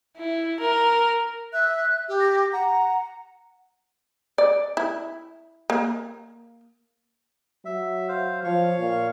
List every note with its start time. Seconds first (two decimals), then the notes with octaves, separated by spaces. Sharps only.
0.17 E4
0.60 A#4
1.53 E5 F#6
2.09 G4
2.20 A#6
2.52 F#5 A#5
4.38 D5
4.77 E4
5.70 A#3
7.65 F#3 E5
8.08 C5 F5
8.44 F3 C#5 F5 C#6
8.79 A#2